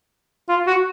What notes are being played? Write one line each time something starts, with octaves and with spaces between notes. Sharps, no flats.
F4
F#4